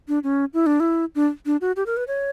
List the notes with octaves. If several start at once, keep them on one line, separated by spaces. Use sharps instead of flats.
D4
C#4
E4
D4
E4
D4
D4
F#4
G4
A#4
B4
C#5